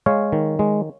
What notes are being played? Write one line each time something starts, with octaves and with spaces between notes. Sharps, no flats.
G#3 C#5 F5
D#3
G#3